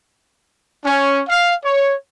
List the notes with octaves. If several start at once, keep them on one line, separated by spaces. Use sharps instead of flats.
C#4
F5
C#5